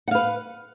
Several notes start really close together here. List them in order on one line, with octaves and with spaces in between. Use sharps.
F#5 F5 B4